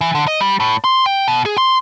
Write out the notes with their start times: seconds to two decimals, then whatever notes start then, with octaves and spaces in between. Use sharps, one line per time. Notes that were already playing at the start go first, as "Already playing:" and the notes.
0.01 E3
0.15 D3
0.27 D#5
0.41 G3
0.60 A2
0.84 C6
1.06 G5
1.28 B2
1.46 G#4
1.58 C6